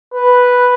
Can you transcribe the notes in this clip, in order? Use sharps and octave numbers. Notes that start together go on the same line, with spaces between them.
B4